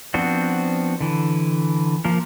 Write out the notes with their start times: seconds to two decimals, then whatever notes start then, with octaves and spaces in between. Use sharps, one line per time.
0.14 F3 B3 C4 D4 F#4
1.01 D3 E3
2.05 F3 A#3 A#4